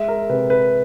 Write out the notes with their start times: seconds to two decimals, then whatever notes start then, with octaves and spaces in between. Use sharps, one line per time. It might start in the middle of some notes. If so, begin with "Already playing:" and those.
Already playing: G#3 E5
0.08 A#4
0.29 C3 B4
0.50 B4